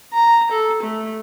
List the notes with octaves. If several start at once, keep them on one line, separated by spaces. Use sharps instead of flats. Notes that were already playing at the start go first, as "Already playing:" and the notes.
A#5
A4
A3